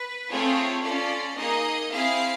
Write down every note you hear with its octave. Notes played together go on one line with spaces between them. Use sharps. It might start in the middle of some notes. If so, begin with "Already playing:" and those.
Already playing: B4
A3 C4 F4 G#4 C#5
C#4 F4 A4 D5
A#3 D#4 G#4 D#5
C4 E4 G#4 F5